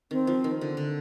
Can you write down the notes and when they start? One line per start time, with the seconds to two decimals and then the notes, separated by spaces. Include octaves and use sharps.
0.11 D#3 C4
0.27 F3
0.44 D#3
0.61 D3
0.77 D3